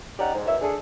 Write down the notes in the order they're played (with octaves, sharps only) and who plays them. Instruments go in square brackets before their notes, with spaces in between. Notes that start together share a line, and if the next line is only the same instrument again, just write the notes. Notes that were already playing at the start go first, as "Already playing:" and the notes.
[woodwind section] C#4 D#4 G4 D5 F#5 A#5
G#2
F#2 B2 C#5 E5
D4 G#4 A4